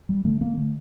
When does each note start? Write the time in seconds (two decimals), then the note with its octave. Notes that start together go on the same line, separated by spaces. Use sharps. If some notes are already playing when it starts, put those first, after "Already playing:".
0.09 G3
0.25 D3 A3
0.41 A#3
0.57 D3 A3